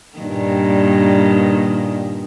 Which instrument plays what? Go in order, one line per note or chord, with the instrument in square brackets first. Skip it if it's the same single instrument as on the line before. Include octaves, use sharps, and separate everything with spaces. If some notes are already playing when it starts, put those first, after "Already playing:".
[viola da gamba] G2 A#2 D#3